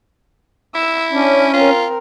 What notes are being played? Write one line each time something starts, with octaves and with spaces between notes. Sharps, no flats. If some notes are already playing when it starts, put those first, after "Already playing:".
E4 E6
C#4 D4
C4 F4 A#4